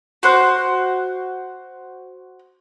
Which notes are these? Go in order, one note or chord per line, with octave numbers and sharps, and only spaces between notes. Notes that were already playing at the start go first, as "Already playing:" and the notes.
F#4 C5 F#6